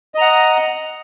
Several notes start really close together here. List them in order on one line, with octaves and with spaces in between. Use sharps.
D#5 A#5 F#5